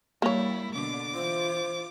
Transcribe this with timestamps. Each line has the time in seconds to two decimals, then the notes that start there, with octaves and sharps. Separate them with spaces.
0.22 G3 A#3 E4 C#5
0.74 B2 D3 D6
1.14 E3 F4 C5